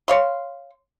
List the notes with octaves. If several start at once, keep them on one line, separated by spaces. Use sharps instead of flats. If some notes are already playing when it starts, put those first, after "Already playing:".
C#5 F5 C6